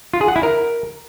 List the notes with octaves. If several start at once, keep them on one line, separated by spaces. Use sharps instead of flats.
F4
G#4
F#5
E4
A#4